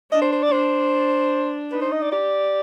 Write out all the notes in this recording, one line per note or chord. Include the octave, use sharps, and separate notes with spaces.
D4 D#5
C5
C5
D5
D4 C5
D#4 B4
C5
D#5
D5
G4 D5